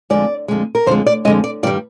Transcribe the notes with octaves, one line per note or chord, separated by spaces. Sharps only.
F2 D3 G#3 D5
F2 D3 G#3
A#4
F2 D3 G#3 C5
D5
F2 D3 G#3 D#5
D5
G2 D#3 G3 D5